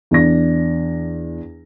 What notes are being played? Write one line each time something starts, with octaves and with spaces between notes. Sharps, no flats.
E2 D4 A#6